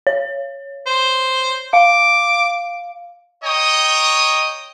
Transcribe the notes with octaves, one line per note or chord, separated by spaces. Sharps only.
C#5
C5
F5 D6
C#5 D#5 G5 A#5 D#6